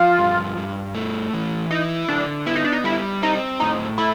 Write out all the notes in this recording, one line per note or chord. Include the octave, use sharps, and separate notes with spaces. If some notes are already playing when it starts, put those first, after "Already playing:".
Already playing: F3 F4
G2
G2
A3
E3
D#4 E4
D3 D4
B3 E4
D#4
D4
D#4
G3 E4
C4 D#4
A2 D#4
A3 E4